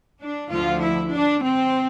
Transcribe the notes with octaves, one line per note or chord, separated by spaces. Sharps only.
D4
D2 D3 F3 F4
E4
D4
C4